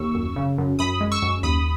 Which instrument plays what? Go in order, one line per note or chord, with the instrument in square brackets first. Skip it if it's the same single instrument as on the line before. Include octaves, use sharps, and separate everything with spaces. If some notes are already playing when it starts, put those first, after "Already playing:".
Already playing: [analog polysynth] D#2 C#6 E6
F#2
C#3
F#2
F#2 B5 D#6
G#3
C#6 E6
F#2
D#2 B5 D#6